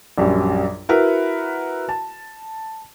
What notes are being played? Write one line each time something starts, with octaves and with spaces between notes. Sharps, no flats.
A#1 F#2 G3
E4 F#4 A#4 B4
A5